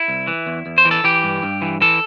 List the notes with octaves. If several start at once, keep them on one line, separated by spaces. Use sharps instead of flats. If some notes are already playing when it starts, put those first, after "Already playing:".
Already playing: E4
C2
E3
E2
E2
C5
E3
A4
E3 G4
G2
G2
E3
E3 A4